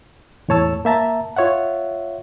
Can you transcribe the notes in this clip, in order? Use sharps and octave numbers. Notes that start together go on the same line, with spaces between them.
E2 A2 C#5 A5 E6
A#3 E5 A5 A#5
F4 C#5 E5 F#5